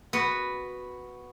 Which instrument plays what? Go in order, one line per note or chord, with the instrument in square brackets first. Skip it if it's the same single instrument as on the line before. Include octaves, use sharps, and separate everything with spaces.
[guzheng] B3 F#4